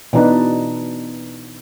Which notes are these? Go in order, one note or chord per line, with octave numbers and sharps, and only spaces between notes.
B2 E3 D4 D#4 B4